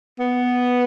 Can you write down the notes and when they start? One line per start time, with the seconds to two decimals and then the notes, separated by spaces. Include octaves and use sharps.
0.20 B3